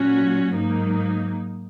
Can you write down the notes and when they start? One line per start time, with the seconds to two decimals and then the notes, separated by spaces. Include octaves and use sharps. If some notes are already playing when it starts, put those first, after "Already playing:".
Already playing: A#2 F#3 C#4 F#4
0.55 G#2 F#3 A#3 D#4